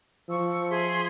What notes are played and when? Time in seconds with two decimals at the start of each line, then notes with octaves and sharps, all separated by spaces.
0.29 F3 C#6 E6
0.70 G#4 E5 C6